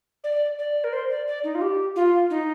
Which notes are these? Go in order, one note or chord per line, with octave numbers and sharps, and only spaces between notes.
D5
D5
A#4
C5
D5
D5
D#4
F4
G4
F4
D#4